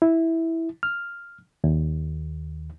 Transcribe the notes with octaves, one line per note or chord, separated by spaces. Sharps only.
E4
F6
D#2